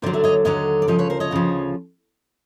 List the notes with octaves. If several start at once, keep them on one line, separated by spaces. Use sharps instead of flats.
D#2 D3 F#3 C5 D5
D5 E5
C#5 D#5
D#2 D3 F#3 C#5 D#5
D5
D2 C#3 F3 C#5 D#5
B4 C#5
A#4 C5
C#5 D#5
D2 C#3 F3